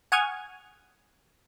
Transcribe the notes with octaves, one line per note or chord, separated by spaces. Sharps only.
F#5 G#5 C#6 D#6 F6 G#6